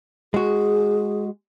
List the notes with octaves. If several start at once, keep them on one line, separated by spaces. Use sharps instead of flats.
G#3 F#4 G#4